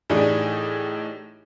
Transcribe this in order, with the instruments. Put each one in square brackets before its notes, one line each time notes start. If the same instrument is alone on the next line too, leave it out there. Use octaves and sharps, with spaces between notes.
[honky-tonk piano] A2 E3 D4 D#4 G4 G#4